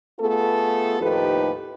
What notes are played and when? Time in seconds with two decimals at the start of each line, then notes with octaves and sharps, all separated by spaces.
0.20 A3 B3 F4 G#4 A4
1.00 D#2 A2 F3 D#4 G4 B4